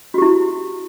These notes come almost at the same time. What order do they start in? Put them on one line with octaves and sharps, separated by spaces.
F#4 G4 E4